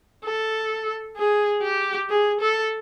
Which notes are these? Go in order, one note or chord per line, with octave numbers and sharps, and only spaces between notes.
A4
G#4
G4
G#4
A4